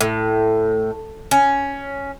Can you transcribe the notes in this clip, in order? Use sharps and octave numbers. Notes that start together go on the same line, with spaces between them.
A2
C#4